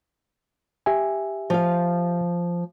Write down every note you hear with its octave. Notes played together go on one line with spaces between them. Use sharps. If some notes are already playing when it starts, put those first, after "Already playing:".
G4 E5 G#5
F3 F5